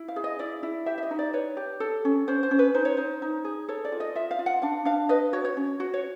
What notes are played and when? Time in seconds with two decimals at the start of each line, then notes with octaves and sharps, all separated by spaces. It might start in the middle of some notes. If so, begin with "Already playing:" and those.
Already playing: E4
0.08 F5
0.16 G#4
0.24 D#5
0.39 E4 D5
0.63 E4
0.86 G4 E5
0.98 E5
1.03 D#5
1.11 D#4
1.19 D5
1.33 B4 C#5
1.57 G4
1.80 A4
2.05 C#4
2.28 C#4 C5
2.43 C5
2.51 C#4
2.59 B4
2.74 D#4 C5
2.85 C#5
2.97 D#4 C5
3.22 D#4
3.44 G#4
3.68 A4 C#5
3.85 D5
3.92 F4
4.00 D#5
4.15 F4 E5
4.31 F5
4.39 F4
4.46 F#5
4.62 D4 F5
4.85 D4 F5
5.09 B4 D#5
5.33 F#4 C#5
5.45 C#5
5.57 C#4
5.80 F#4
5.94 C#5